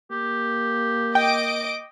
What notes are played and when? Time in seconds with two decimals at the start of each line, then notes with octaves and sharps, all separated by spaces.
0.11 A#3 G4
1.15 D#5 G5 D6 D7